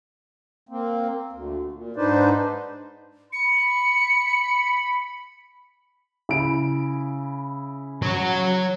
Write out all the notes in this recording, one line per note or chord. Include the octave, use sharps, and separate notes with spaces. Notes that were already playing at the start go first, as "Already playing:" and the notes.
A#3 C4
D2
A#2
G#2 D4 D#4 B4 C5 D5
B5 C#7
C#3 E4 D7
F#3 C#5